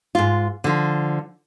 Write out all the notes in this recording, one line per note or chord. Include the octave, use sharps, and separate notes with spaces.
G#2 F4
D3 F3